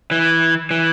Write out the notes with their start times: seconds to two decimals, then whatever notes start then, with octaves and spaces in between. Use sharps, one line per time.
0.11 E3
0.71 E3